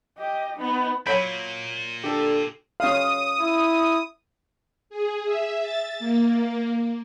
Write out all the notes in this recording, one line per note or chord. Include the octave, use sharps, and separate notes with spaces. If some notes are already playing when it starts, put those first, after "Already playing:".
G4 D#5
B3 D#4
A#2 F#3 C#5 B5 G6 B6 D7
D3 G4 A4
C#4 F5 D#6
E4
G#4
E5
A6
A#3